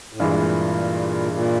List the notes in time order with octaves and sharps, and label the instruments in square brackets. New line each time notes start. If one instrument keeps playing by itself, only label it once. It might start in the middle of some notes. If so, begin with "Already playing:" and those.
[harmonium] A2
[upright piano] G2 E3 G#3 [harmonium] A#2
[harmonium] A#2